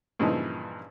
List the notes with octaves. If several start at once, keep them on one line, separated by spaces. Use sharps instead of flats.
G2 A#2 C#3 E3 F3 D#4